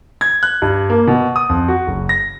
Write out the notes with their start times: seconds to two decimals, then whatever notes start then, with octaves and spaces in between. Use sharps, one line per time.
0.21 G#6
0.43 F#6
0.62 G2
0.90 A#3
1.07 B2
1.36 D#6
1.49 F2
1.68 F#4
1.87 F#1
2.09 A#6